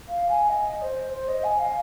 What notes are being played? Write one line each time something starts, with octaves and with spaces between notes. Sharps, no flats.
F5
G#5
D#5
C5
C5
D#5
G#5
F5